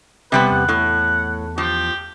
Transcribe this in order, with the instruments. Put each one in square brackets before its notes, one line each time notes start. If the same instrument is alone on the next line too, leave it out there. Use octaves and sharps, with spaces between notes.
[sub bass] E1 [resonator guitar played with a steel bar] C3 G3 B3 [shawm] B4
[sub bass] E2 [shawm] F#5
[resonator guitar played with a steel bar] A2
[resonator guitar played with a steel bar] F3 [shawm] G4